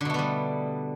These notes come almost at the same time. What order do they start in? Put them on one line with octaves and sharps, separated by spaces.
D3 B2 A3 B3 G3